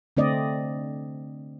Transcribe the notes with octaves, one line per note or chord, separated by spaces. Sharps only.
D3 A3 C4 D4 D5 D#5